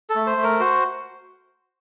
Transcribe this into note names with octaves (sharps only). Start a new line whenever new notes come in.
A4
A3
C5
A3
A#4
F#4 C5